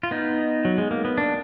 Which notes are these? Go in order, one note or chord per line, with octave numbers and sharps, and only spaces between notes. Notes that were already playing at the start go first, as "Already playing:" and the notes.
F4
B3 D#4
F#3
G#3
A#3
B3
A#3 D4